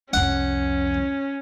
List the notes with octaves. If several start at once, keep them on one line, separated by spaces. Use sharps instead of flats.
C2 F2 C#4 F#5